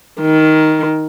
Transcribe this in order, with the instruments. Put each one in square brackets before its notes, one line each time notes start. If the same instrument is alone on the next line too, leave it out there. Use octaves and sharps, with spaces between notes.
[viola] D#3